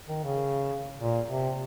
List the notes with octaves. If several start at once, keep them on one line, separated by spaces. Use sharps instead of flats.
D#3
C#3
A#2
C3